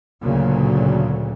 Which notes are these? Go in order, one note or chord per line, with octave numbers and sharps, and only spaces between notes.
D2 A#2 C#3 F#3